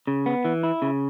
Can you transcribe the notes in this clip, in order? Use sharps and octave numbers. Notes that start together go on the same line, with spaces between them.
C#3
B3
E3
E4
C#3